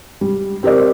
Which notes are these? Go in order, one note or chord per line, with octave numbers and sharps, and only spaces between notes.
G3
C4 G4 A#4 D5